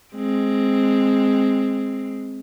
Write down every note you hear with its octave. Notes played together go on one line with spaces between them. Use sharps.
G#3 C4